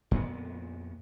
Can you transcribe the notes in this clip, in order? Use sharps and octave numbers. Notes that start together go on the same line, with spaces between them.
F2 A#2 B3